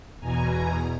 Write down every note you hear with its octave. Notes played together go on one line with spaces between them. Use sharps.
E2 B2 G#5 A#5